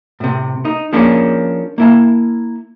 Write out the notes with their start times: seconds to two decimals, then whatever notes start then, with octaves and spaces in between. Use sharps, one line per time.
0.20 A2 C3
0.65 D#4
0.93 F3 A#3 C#4 D4 G#4
1.78 A#3 E4 A5